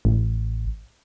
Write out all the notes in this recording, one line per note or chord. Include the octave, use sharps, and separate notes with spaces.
A1